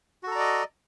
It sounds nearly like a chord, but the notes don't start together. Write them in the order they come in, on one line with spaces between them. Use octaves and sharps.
F#4 A4 A#5 D5 D#5